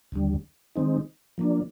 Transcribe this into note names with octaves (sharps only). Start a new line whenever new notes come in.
D#2 D3 G3
D#3 G#3 C4 D#4
F3 A#3 D4